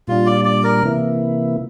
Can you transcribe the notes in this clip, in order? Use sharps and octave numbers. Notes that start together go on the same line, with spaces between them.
A#2 G3 D4 F4
D5
D5
A#4
C3 E3 A#3 E4